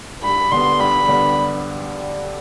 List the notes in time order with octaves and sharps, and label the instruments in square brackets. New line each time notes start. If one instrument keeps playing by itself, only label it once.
[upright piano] G2 [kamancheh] B5
[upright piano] D3 G3 B3 D4 [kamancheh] C6
[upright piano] G2 [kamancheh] B5
[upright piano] D3 G3 B3 D4